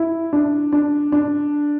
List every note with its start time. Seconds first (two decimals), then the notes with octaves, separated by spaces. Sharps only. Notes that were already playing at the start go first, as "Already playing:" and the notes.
Already playing: E4
0.33 D4
0.73 D4
1.12 D4